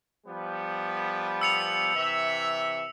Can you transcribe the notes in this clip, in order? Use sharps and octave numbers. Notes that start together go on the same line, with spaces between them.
F3 G3 B3
E6 C#7 F7
C3 E3 E5